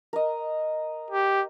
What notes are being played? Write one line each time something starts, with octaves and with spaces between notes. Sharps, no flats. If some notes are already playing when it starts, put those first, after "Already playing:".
A#4 D#5
G4